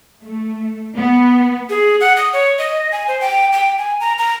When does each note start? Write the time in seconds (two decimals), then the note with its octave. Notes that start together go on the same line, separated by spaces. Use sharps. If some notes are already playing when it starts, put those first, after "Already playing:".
0.22 A3
0.97 B3
1.70 G#4
2.01 F#5
2.17 D#6
2.33 C#5
2.59 D#5
2.92 G#5
3.08 C5
3.21 G5
3.53 G5
3.78 G#5
4.00 A#5
4.18 A#5